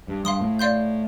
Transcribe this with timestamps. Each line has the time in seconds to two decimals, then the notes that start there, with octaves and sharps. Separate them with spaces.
0.08 G2
0.25 G2 F5 C6 D#6
0.41 A2
0.59 D5 F5 C6 G6